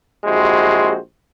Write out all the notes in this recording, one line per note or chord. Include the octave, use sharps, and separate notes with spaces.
A#1 G#3 E4 F#4 G4 C5